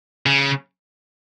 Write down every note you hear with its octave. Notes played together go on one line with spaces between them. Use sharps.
C#3